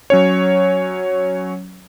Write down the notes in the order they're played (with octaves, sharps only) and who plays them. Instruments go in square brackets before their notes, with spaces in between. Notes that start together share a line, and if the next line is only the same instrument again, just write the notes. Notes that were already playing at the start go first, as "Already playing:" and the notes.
[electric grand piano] F#3 C#4 C#5